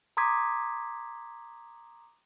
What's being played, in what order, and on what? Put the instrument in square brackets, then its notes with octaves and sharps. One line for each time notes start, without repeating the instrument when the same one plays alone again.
[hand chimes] A#5 C6 D6 D#6 G#6 B6